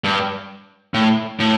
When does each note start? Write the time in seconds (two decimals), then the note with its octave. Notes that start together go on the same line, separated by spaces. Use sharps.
0.04 G2
0.94 A2
1.40 A2